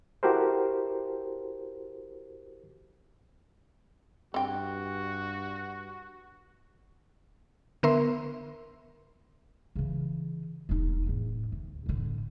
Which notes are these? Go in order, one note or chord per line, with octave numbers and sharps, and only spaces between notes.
E4 F#4 G4 A4 A#4 C5
G2 C4 F#4 G5
D3 B3 A#4 E5 C6
C#3 E3
E1 D#4
E2 A2
D2
A2 D3